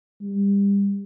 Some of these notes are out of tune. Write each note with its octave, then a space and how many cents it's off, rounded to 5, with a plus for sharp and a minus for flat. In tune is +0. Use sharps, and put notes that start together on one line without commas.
G3 +30